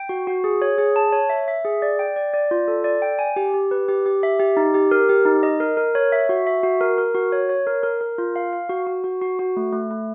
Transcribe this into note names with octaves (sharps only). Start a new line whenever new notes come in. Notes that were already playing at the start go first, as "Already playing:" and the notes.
Already playing: G5
F#4
F#4
G#4
C#5
G#4
A5
C#5
E5
E5
G#4
D5
G5
D5
D5
F4
A4
D5
G5
G#5
G4
G4
B4
G4
G4
E5
G4
D#4
G4
A#4
G4
D#4
D#5
A#4
A#4
C#5
E5
F#4
E5
F#4
A#4
A#4
F#4
C#5
C#5
A#4
A#4
A#4
F4
F5
F5
F#4
F#4
F#4
F#4
F#4
A3
A3
A3